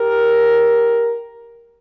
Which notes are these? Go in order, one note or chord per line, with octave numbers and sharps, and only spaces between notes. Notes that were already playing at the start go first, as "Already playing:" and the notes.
Already playing: G4 A#4